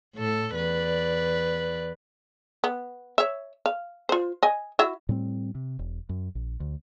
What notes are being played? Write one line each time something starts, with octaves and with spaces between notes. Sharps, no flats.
A2 A4
E2 B4 D5
B3
C#5 E5
F5
F4 C5
D#5 G#5
E4 F#4 E5
A2 G3 C4
C3
E1
F#2
A#1
D2